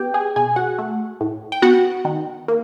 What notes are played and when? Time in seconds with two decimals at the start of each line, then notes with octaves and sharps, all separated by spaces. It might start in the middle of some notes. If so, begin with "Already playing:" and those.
Already playing: B3 G4 G5
0.14 G#4 G#5
0.36 B2 G#4 G#5
0.56 F#4 F#5
0.79 A3
1.21 A2
1.52 G5
1.62 B3 F#4 F#5
2.05 D#3
2.48 A#3